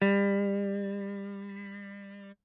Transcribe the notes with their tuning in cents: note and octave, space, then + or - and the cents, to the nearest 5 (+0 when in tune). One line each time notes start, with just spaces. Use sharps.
G3 +30